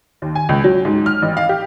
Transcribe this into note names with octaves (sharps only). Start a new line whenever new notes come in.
D#2
G#5
C#2
F#3
G#2
F6
A1
F5
G4